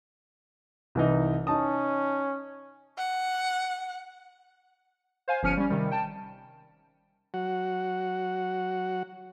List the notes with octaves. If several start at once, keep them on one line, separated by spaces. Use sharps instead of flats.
C2 E3 D#4
C#4 D#4 A5 D#6
F#5
C5 F5 G#5
G1 F3 C#4 F6 C#7 D#7
G3 C#4
C3 D#3 G3
G5 A5
F#3 F#4 F#5